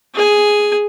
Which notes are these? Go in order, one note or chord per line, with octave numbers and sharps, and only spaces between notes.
G#4 G#5